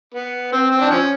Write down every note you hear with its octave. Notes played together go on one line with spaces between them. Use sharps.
B3
C4
C4
D4
F3 C#4